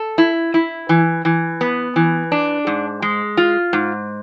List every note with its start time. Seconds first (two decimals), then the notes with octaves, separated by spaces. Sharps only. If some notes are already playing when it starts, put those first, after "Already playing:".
Already playing: A4
0.18 E4
0.54 E4
0.89 E3
1.25 E3
1.61 B3
1.96 E3
2.32 D4
2.67 G#2
3.02 G#3
3.37 F4
3.73 G#2